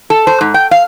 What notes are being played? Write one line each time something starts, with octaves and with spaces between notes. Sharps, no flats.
A4
C5
G#2
G5
F5